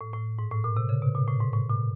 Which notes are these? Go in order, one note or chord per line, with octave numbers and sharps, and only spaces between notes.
A2
A2
G#2
A2
A#2
C3
C#3
B2
A#2
A2
G#2
A2
A#2